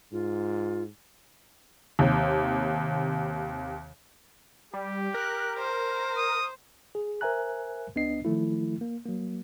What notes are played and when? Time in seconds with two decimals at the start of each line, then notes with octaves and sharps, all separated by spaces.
0.12 G#2 F4
1.99 D#2 C3
4.74 G3 G4
5.14 A#4 F#6
5.58 C5
6.17 D#6
6.95 G#4
7.21 A#4 C5 E5 G#5 A#5 F#6
7.95 C#2 B3 D4 D#5 C7
8.25 D#3 F3 A3 E4
8.81 A#3
9.06 F#3 A#3